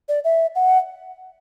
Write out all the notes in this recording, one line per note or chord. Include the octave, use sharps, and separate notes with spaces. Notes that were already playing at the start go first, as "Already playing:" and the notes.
D5
E5
F#5